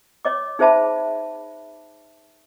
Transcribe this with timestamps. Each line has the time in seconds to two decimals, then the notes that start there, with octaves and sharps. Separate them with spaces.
0.25 C#5 D#5 D6
0.59 D#4 G#4 C5 E5 A5 B5